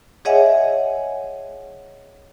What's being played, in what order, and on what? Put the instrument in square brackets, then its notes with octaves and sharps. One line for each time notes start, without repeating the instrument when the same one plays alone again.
[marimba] G#4 C#5 D#5 E5 F#5 G#5